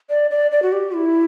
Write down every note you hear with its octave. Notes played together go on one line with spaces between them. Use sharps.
D5
D5
D5
F#4
G4
E4